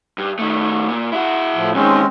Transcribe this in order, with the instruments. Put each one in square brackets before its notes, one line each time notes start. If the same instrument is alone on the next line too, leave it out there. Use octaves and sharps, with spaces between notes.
[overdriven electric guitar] G2
D#3 A3
A#2
E4 F#4
[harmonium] A2 F3
[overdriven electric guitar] E2 D#3 [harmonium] G#3 C4 C#4